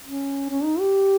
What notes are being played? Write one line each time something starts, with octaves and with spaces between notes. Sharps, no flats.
C#4
C#4
D#4
G4